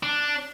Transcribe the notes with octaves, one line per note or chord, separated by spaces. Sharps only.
D4